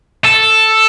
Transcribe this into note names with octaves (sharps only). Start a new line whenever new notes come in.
A4